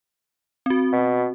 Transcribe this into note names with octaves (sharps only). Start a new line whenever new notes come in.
C4 F#4
B2